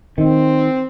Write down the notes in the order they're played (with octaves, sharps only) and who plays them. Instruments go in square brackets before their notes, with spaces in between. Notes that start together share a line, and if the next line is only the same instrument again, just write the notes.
[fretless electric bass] D#3 [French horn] C4